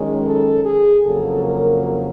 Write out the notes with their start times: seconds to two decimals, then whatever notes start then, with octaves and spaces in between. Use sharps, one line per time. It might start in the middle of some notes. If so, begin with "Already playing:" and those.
Already playing: F#2 D#3 G#3 C#4
0.26 A4
0.65 G#4
1.05 F2 C#3 F#3 A#3 A4
1.45 A#4